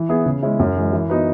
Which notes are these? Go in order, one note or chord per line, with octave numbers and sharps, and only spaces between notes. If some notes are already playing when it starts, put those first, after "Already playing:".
Already playing: E3
B3 E4 G#4 B4
C#3
G#3 C#4 E4
F#2
E3 G#3
E3
B3 D#4 F#4 B4